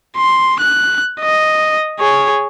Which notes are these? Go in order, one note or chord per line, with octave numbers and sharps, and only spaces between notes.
C6
F#6
D#5
G#4 C#5